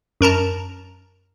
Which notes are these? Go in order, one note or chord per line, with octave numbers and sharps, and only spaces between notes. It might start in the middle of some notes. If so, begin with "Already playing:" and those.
F#2 A#4 A5 A#5